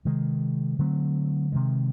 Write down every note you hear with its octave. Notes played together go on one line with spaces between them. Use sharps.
C3 D#3 G#3
D3 F#3 A3 C4
C3 D#3 G#3